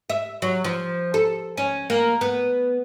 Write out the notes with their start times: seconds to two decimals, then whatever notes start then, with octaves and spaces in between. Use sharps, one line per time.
0.10 E5
0.42 F#3
0.64 F3
1.14 A4
1.57 C#4
1.90 A#3
2.21 B3